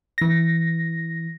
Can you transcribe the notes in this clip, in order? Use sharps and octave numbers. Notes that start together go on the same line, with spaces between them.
E3 A#6